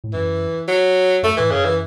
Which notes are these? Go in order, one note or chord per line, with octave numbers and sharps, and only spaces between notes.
A2
F#2 E3
F#3
F#2 A3
A2 E3
F#2 C#3
E3